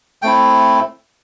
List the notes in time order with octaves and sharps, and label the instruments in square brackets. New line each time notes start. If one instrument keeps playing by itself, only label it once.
[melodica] A3 C4 E4 G5